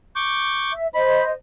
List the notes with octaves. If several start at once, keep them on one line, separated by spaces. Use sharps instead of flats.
C#6 D6 G6
E5
C5 D#5 B5